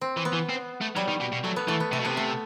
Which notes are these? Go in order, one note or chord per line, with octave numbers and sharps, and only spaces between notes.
C4
E3
B3
E3
C4
A3
F#3 G3
D#3
B2
B2
F#3 A3
B3
E3 A3
B3
C3 A3
B2
C3 B3
A3